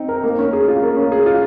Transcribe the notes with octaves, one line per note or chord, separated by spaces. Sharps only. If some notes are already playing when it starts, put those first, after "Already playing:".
Already playing: C4 D#4
A#4
A#3
C#4
G#4
F4
A#3
C#4
G#4
F4